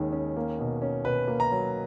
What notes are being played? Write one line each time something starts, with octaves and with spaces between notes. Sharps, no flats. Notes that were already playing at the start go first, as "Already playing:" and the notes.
Already playing: D#2 D#3 G#3 C#4
C#4
A#3
B2
C#4
B2 B4
A#3
A#5
F#3